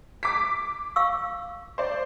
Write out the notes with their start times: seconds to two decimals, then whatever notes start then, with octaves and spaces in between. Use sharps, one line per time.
0.23 D6 B6
0.96 F5 C#6 E6
1.78 C5 D5